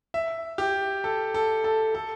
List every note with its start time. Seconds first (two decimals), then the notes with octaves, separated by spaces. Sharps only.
0.14 E5
0.58 G4
1.04 A4
1.34 A4
1.64 A4
1.95 A4